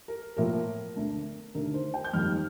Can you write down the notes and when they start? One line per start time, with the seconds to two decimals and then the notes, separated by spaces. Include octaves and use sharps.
0.08 A#4
0.37 A2 F3 A#3 A#4
0.96 D2 D3 A3
1.55 D#2 D3 A3 A#4
1.74 C5
1.94 G5
2.04 G6
2.13 F2 D#3 G3 A#3 F6